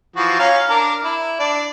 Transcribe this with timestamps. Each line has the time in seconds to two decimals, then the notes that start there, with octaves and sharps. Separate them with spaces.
0.16 E3 F3 F#4
0.39 C#4 F5 A#5
0.70 D4 A#4
1.04 E4
1.40 D4 D5